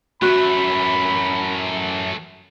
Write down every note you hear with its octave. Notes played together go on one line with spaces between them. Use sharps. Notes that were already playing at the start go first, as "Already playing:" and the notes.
F#2 E3 A3 F#4 E5 B5